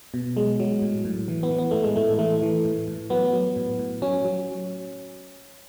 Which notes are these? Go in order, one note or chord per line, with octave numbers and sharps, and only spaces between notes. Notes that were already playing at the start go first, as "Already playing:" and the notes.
B2
F#3 G#3
F#3
A2
A2
E3
B3
E3
B3
A2 A3
G#3
A2 A3
E3 A3
E3
A2
A2
F#3 B3
F#3
A2
A2
F#3 C#4
F#3